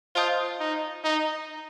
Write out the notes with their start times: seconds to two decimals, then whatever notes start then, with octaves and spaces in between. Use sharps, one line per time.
0.15 F4 C5 D#5 A5 D#6 G6
0.60 D#4
1.04 D#4